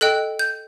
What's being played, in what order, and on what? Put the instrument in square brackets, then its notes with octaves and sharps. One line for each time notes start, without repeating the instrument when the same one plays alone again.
[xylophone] A4 D#5 G5 F#6
G6